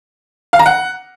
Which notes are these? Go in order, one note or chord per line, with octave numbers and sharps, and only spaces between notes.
F5
A#5
F#5